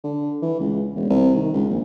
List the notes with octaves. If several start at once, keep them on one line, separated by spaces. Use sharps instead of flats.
D3
E3
C#2
E1
C2
D#3
C#2
A#1